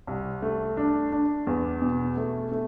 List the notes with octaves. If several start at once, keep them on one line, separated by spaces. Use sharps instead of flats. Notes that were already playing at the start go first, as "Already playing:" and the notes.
C2
A3
D4
D4
E2
B2
A3
A3